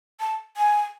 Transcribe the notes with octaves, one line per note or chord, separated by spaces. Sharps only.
A5
G#5